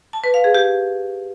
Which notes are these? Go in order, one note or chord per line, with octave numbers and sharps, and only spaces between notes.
A5
B4
F5
G#4
G4